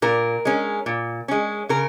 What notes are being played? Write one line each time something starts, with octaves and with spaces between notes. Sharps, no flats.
A#2 A#4
G#3 C#4
A#2
G#3 C#4
C#3 A#4